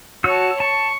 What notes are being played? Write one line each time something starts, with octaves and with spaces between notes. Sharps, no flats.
F#4 C#5 A5 E6
A5 C#6